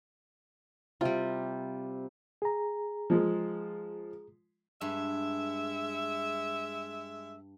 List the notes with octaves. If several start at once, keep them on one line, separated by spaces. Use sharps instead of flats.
C3 G3 F4
G#4 A#5
F3 G#3
G2 G#3 E5